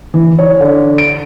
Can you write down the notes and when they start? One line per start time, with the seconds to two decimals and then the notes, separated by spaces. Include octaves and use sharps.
0.14 E3
0.39 C#5
0.61 D3
0.98 D7